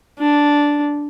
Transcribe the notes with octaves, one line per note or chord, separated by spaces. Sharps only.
D4